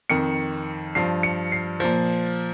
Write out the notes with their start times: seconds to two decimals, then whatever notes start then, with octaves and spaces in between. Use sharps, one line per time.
0.10 F2 D#3 C#7
0.95 G2 F3 C7
1.23 C#7
1.52 C7
1.80 A#2 F3